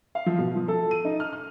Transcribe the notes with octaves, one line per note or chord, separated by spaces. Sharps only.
F5
F3
B2
F3
A4
D#7
D#4
F6
F6